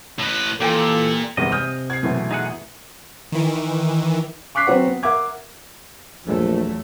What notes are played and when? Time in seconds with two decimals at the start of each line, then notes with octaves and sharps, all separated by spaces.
0.19 A2 B4
0.60 A#2 E3 F4 G4 A4 G5 G#5
1.37 G#1 E2 G2 C3 E4 D#5
1.52 G#5 D#6 F6 G6
1.90 G#6 C7
2.03 F#2 B2 E3 A3
2.31 D#4 G#4 F#5
3.32 D#3 E3
4.55 C#6 D6 F#6 B6 C7
4.67 F#3 C4 F#4 B4 F#5
4.87 B3
5.03 A#4 E5 F#5 D6 G#6
6.27 A#1 E2 F#3 A3